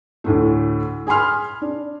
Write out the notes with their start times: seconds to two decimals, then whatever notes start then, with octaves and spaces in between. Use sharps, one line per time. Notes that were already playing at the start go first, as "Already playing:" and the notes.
0.24 D2 A2 A3
1.07 G#4 G#5 B5 C6 F6
1.61 D4